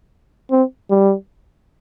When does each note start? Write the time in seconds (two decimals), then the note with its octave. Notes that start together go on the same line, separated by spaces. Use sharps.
0.51 C4
0.90 G3